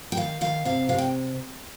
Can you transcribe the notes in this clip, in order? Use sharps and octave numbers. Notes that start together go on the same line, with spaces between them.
G5
D#3 F5
D#3 F5
C3 F5
C3 F5
G5